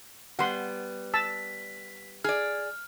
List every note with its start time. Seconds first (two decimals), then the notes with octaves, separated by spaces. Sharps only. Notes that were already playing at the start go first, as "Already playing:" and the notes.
0.39 G3 B3 F#5 C6
1.14 A5 E6 B6
2.24 G#4 D5 F6